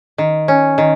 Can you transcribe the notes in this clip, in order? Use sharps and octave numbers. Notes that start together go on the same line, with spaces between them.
D#3
C#4
D#3